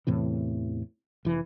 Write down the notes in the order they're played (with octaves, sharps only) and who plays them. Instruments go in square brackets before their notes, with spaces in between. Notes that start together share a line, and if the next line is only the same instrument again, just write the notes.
[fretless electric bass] E2 A2 C3 E3
F1 E3